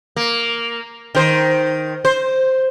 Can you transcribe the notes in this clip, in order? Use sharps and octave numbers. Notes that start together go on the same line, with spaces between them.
A#3
D#3 C5
C5